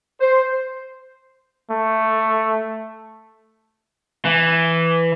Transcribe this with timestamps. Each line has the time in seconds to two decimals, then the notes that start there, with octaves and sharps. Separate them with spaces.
0.21 C5
1.71 A3
4.25 E3